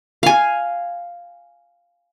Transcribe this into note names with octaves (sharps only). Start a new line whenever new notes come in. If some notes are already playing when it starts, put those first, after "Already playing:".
F5 G#5